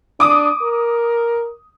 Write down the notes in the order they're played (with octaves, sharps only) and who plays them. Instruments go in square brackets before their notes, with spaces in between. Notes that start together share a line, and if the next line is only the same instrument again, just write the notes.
[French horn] D4 [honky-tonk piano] D6 D#6
[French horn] A#4